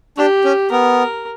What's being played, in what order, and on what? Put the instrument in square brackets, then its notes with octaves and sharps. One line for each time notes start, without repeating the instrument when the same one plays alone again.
[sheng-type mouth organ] D4 [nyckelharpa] G4
[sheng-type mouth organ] C#4
[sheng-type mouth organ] B3 [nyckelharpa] A#4